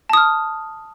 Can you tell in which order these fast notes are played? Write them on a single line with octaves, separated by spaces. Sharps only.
A5 D#6 F6